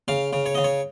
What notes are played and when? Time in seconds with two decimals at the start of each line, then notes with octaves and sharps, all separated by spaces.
0.08 C#3 F5
0.33 C#3
0.46 C#5
0.55 C#3 D#5
0.64 C#5